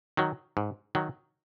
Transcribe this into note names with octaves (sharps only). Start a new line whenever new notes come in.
D#3 F#3
G#2
D#3 F#3